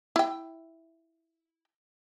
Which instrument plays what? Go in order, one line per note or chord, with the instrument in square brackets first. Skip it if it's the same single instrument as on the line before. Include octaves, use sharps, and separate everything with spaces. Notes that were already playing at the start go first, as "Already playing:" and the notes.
[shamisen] E4 G5